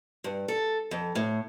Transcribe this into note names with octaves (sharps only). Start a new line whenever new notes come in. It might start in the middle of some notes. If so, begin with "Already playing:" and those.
G2
A4
F2
A2